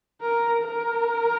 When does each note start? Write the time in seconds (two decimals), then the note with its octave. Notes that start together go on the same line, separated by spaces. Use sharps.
0.22 A#4
0.63 A#4